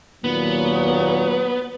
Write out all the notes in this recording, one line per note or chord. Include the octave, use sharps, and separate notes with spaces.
D#2 A#2 F#3 B3